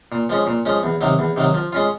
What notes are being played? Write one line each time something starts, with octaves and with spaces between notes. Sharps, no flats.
A#2
F3 G#3 C#4
A#2
F3 G#3 C#4
E2
C3 D#3 F#3
E2
C3 D#3 F#3
F3
G#3 C#4 F4